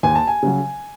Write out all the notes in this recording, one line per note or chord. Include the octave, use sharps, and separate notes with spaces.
D#2 G#5
A5
G#5
C#3 F#3